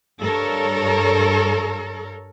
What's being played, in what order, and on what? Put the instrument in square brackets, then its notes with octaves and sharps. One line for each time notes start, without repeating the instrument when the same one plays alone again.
[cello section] G2 A4 A#4 C#5